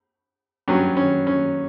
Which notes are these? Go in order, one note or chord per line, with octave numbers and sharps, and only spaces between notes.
G2 F#3 C#4
C#4
C#4